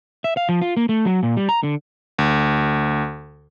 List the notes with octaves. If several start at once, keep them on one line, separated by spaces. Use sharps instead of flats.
E5
F5
F3
F4
A#3
A3
F#3
A#2
G3
A#5
D3
D2